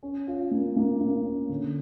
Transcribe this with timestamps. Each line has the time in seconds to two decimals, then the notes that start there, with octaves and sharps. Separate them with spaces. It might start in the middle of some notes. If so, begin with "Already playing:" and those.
0.03 C#4
0.27 F4
0.51 A#3
0.76 A#3
1.01 A#3
1.25 C#4
1.49 D3